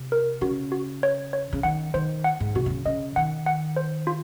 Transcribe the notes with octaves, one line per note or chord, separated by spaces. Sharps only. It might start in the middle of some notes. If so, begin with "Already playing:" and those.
Already playing: C3
A#4
C#3 F#4
F#4
C#5
C#5
C#3
D#3 F#5
D#3 C5
F#5
G#2
C3 F#4
C3
C#3
C#3 D#5
D#3 F#5
F#5
C5
F4